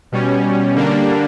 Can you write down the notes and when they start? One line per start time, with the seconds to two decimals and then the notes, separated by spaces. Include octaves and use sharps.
0.12 B2 G3 C#4
0.76 D3 G3 A#3 D4